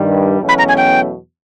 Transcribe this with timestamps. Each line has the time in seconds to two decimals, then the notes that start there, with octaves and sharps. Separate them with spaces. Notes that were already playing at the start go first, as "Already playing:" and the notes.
Already playing: G2 D#3 G3
0.39 E2 B2 F#3 A3 C#4
0.49 B5
0.58 A#5
0.69 G#5
0.77 G5